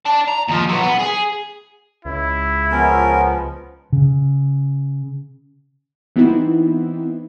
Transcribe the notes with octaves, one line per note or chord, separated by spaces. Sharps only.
D5 A5
A#5
D#2 F3
F#3 B3
B3
G#4
C#2 E4
F3 B3 C#4 A#4
C#3
E3 B3 C4 D#4 E4